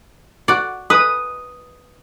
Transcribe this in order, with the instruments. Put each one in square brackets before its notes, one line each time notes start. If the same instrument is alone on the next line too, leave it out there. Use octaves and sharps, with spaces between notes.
[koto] F#4 D5
[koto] B4 [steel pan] D#6